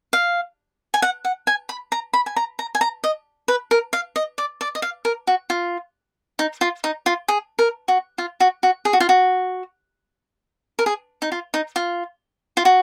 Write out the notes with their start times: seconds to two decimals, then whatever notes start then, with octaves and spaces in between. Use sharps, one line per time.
0.13 F5
0.94 G#5
1.02 F#5
1.25 F#5
1.47 G#5
1.69 B5
1.92 A#5
2.13 B5
2.26 G#5
2.36 A#5
2.59 A#5
2.75 G#5
2.81 A#5
3.04 D#5
3.48 B4
3.71 A#4
3.93 F5
4.16 D#5
4.38 D5
4.61 D5
4.75 D#5
4.82 F5
5.05 A#4
5.27 F#4
5.50 F4
6.39 D#4
6.61 F4
6.84 D#4
7.06 F4
7.28 G#4
7.59 A#4
7.88 F#4
8.18 F4
8.40 F#4
8.63 F#4
8.85 G#4
8.93 F#4
9.00 F4
9.09 F#4
10.79 A#4
10.86 G#4
11.22 D#4
11.32 F4
11.54 D#4
11.76 F4
12.57 F4
12.65 F#4